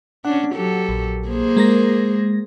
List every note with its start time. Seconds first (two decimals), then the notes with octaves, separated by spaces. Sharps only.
0.25 C#4 D4 F#5
0.54 F#3 G4 A4
0.89 A#1
1.28 A#3 G#4 C5
1.57 G#3 A#4 A#6